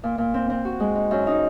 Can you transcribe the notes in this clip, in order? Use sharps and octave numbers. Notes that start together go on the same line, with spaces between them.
A#2
A#2
C4
C4
F#4
G#3
D#4
F#2
D#4